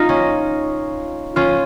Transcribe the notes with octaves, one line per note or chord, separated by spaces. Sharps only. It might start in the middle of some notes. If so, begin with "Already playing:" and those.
Already playing: D#4 F4
C#4
C#4 F4